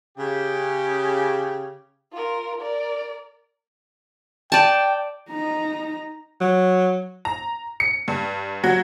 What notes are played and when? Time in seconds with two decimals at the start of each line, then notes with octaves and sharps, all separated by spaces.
0.18 C#3 G4
2.12 F4 A#4
2.61 A#4 D5
4.52 D5 G5 A5
5.30 D#4 A#5
6.41 F#3
7.25 A#5
7.80 C#7
8.08 G2
8.64 F#3